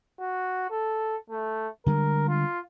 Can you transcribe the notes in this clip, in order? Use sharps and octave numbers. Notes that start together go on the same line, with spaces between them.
F#4
A4
A3
D3 G3 G#3 A#4
F4